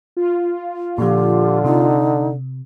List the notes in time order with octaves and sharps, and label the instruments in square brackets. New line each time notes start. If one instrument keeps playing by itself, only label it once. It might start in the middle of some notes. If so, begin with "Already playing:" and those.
[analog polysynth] F4
[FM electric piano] A#2 F3 [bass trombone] D3 [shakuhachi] G4
[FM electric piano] C3 [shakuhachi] D#4